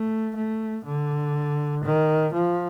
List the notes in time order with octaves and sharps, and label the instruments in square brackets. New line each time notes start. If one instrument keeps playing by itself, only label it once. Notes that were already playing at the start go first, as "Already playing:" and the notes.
Already playing: [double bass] A3
A3
D3
D#3
F3